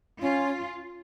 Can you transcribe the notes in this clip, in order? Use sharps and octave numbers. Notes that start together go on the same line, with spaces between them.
C#4 F4